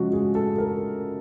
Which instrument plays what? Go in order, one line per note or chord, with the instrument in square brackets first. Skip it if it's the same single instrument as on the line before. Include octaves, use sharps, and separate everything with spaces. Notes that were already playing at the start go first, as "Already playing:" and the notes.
Already playing: [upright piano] C#3 F3 G#3 F#4
G#4
A4
A#4